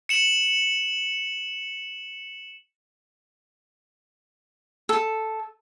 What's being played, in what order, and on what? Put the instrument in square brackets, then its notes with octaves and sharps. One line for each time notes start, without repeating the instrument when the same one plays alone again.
[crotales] C#7 E7 F#7
[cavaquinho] A4